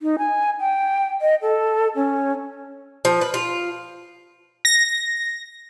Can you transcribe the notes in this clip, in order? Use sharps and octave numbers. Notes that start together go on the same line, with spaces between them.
D#4
G#5
G5
D#5
A4
C#4
F3
B4
F4
A#6